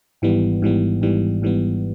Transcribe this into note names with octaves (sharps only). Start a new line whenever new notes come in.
G#1 G#2 E3 G3 B3
G#1 G#2 E3 G3 B3
G#1 G#2 E3 G3 B3
G#1 G#2 E3 G3 B3